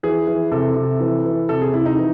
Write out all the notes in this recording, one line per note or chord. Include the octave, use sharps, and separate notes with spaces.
E3 G#4
E3
C3 A4
C3
E3
E3
C3 A4
G#4
C3 E4
D#4
E3